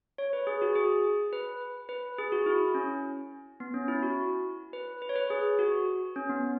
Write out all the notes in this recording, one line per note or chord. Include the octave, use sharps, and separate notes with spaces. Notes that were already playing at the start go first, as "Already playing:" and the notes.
C#5
B4
G#4
F#4
G#4
B4
B4
G#4
F#4
E4
C#4
B3
C#4
E4
F#4
B4
B4
C#5
B4
G#4
F#4
C#4
B3